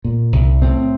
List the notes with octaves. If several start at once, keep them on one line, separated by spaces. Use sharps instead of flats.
A#2
C2
A2 C4